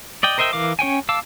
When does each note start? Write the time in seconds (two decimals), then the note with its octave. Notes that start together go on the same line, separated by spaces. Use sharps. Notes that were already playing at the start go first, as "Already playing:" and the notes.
0.23 D5 D#5 G5
0.38 A#4 C5 D#5 E5 G5
0.53 E3 A#4 F5 D6
0.79 C#4 C#5 G5 G#5
1.09 F5 A5 D6 E6